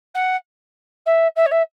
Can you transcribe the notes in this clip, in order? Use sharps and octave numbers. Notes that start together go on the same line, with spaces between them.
F#5
E5
E5
C#5
E5